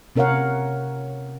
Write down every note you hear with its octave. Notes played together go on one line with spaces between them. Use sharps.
C3 C#4 A#4 C#5 F5 F#5